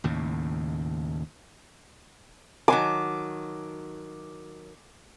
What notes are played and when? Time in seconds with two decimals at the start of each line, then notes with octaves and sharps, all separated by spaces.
0.04 D#2 A2 C#3
2.68 D#3 F#3 G#5 D6